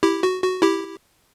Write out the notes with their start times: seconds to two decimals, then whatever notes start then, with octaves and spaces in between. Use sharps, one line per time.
0.03 E4 G4
0.23 F#4
0.43 F#4
0.62 E4 G4